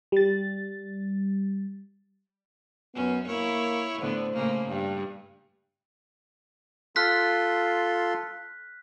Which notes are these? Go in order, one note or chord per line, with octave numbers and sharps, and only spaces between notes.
G3 A6
F#2 B3 C#4
A#3 E4 C#5
A2 D3 B3 C5
A2 C#3 A#3
G2
F4 A4 C6 F6 F#6 B6